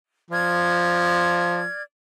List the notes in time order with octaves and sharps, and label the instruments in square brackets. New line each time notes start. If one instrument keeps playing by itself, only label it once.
[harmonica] F3 [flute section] D5 F6 G#6